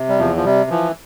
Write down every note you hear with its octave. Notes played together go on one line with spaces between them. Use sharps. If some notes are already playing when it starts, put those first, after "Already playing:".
Already playing: C3
G3
E2 F3
F3
C3 G3
E3 F3